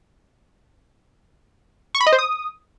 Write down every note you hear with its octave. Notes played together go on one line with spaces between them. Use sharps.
C#6
B5
D#5
C5
D#6